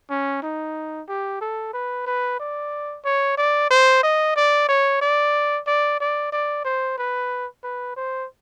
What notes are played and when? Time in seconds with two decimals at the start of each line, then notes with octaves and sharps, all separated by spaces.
0.10 C#4
0.43 D#4
1.08 G4
1.41 A4
1.73 B4
2.07 B4
2.40 D5
3.05 C#5
3.38 D5
3.70 C5
4.03 D#5
4.36 D5
4.68 C#5
5.01 D5
5.67 D5
6.00 D5
6.32 D5
6.65 C5
6.98 B4
7.63 B4
7.96 C5